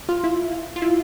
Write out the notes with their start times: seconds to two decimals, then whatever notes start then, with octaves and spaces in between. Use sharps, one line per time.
0.09 F4
0.24 E4
0.76 F4
0.82 E4